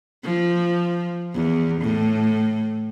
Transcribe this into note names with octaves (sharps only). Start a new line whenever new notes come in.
F3
E2
A2